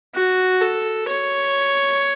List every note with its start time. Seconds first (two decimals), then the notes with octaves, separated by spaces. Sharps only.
0.15 F#4
0.61 A4
1.08 C#5